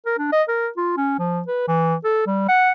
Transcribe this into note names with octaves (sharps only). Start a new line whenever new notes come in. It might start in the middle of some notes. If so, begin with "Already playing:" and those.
A#4
D4
D#5
A#4
F4
C#4
F3
B4
E3
A4
G3
F#5